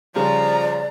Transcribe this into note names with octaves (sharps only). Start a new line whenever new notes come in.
C#3 F3 G3 D5 A#5